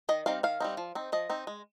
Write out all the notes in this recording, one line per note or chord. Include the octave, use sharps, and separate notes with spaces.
D#3 D#5
G3 C4 D#4 F5
D#3 F5
G3 C4 D#4
F3
C4 D#4
F3 D#5
C4 D#4
G#3